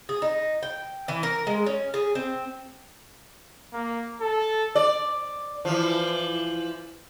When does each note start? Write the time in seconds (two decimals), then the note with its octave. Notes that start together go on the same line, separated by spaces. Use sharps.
0.09 G#4
0.22 D#4
0.63 G5
1.08 E3
1.23 A#4
1.47 G#3
1.66 C#4
1.94 G#4
2.15 C4
3.73 A#3
4.21 A4
4.75 D5
5.65 E3 F3